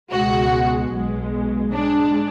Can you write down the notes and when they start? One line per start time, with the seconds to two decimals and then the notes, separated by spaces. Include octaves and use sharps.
0.12 C#2 B2 G#3 F#4
0.93 B1 B2 G#3
1.73 G#2 G#3 D4